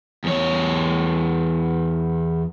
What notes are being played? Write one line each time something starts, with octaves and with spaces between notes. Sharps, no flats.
E2 C#5